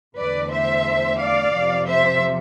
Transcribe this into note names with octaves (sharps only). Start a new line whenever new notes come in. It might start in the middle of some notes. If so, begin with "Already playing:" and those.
E2 D3 A3 B4 D5
C5 E5
D5 F5
F2 C3 F3
C5 E5